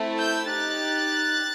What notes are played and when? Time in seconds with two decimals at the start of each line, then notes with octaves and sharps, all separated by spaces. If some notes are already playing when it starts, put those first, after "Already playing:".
Already playing: A3 C4 E4 A4
0.19 E6 G6
0.49 D#4 G4 F#6 A6